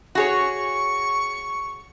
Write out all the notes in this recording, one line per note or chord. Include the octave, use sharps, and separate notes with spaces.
F#4 G#4 C#5 C#6